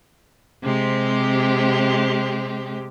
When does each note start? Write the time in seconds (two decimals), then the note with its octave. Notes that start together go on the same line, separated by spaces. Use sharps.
0.63 C3 G#3 C4 G4